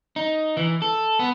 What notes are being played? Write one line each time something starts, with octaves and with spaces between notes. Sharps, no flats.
D#4
E3
A4
B3